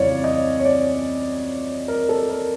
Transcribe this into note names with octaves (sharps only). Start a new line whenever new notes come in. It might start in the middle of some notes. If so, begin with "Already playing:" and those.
Already playing: F2 C#3 E3 G3 C#5 D5 F5
D#5
C#5
D5
A#4
A4
A#4